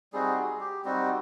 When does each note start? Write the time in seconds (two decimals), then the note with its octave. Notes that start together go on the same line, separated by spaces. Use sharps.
0.13 G3 C4 D#4 F#4 G#4
0.36 G#4
0.60 G4
0.85 G3 C4 D#4 F#4